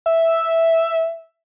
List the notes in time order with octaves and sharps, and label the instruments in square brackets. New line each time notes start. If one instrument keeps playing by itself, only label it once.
[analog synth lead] E5